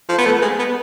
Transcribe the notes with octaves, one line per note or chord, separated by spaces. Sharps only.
F3
B3
A3
G#3
B3